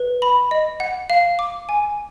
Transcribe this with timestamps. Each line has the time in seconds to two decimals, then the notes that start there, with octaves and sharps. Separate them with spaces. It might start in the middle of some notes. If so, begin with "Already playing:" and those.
Already playing: B4
0.22 B5
0.51 D#5
0.80 F#5
1.10 F5
1.39 D6
1.69 G#5